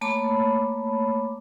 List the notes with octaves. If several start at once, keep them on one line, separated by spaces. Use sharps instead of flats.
A3 A#3 C#5 A5 B5 D6